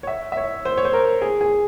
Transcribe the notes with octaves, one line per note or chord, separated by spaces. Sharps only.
C#5
E5
E5
C#5
C5
C#5
C5
A#4
G#4
G#4